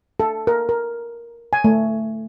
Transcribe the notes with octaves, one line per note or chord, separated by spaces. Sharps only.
A4
A#4
A#4
G#5
A3